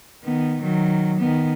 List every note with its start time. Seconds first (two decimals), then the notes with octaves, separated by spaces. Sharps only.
0.24 D#3 B3
0.61 D#3 F#3
1.19 D#3 B3